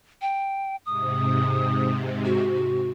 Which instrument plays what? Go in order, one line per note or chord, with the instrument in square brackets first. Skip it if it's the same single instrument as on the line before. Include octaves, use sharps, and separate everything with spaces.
[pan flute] G5
[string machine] G#2 C3 [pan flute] D#6
[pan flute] F#4